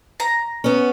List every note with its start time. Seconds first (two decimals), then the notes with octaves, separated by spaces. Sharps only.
0.20 A#5
0.64 B3 C#4